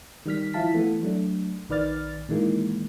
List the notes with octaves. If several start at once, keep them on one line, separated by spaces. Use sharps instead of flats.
D#3 G3 F6 B6
F3 E4 F5 A5 B6
E3 A3 B3
F#3 A3 D4
A#1 D#3 B4 D5 F6 A6
A#2 D#3 E3 G#3 A#3